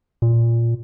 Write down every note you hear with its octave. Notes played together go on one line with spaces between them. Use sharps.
A#2